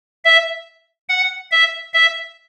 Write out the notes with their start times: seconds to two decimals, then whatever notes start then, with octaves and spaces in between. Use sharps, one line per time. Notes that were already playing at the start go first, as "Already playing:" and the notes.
0.25 E5
1.09 F#5
1.51 E5
1.94 E5